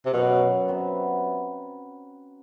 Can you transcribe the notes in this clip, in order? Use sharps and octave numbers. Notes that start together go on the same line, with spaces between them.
C3
F#2 B2 F#3 B3
C3 F#3 B3